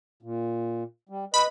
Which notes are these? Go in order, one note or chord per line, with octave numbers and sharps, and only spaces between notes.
A#2
G3
B4 D#5 B5